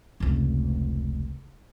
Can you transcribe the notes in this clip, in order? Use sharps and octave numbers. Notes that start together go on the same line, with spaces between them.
F1 C#2